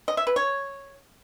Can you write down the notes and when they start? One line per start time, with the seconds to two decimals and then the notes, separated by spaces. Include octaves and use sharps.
0.08 D#5
0.17 E5
0.27 B4
0.36 C#5